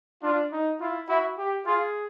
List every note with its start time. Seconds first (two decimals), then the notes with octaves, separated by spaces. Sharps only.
0.23 D4 F4
0.52 D#4
0.80 E4 F4
1.08 E4 F#4
1.38 G4
1.66 F4 G#4